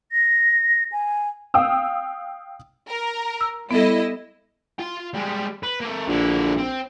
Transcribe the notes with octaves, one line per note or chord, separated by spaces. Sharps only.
A#6
G#5
F5 G5 D#6 E6
A#4
E6
G3 B3 E4 A4 D#5
F4 C6
G3 G#3
B4
A#3 A4
A#1 D3 E4
C4